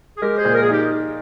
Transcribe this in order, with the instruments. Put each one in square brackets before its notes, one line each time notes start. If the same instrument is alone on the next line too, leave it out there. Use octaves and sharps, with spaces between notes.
[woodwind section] G#4
[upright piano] G#3 [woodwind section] G4 A#4
[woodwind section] G#4 C5
[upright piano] A#2
[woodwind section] A#4
G#4
[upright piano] D#4 [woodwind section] G4